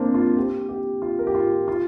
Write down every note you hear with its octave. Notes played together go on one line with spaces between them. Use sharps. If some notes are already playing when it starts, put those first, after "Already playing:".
Already playing: A#3 C4 D4
F4
G4
G4
F4
A#4
G4
F4
F4